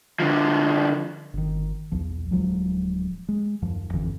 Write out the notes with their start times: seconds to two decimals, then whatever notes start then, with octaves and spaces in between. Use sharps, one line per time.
0.20 D3 F3
1.33 G1 D#3
1.92 B1 E2 F3
2.31 D1 F3 F#3 G#3
3.29 G#3
3.62 D#1 F#2 F3
3.93 G#1 F2 D3 E3